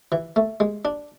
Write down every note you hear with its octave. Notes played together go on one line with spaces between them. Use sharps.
E3
A3
G#3
D4